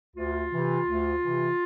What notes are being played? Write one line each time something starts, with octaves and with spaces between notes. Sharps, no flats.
D2 F4
C3 E3
D2
C3 E3